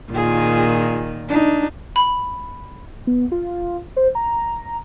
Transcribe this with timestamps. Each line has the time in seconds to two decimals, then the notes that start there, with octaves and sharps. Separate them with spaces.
0.12 A#2 D#3 F4 G#4
1.29 D4 D#4
1.96 B5
3.07 B3
3.32 F4
3.96 C5
4.15 A#5